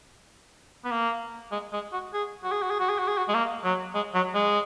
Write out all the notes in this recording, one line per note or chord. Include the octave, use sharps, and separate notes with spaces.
B3
A#3
G#3
G#3
F#4
G#4
F#4
G#4
F#4
G#4
F#4
G#4
F#4
G#4
F#4
G#3
A#3
F#3
G#3
F#3
G#3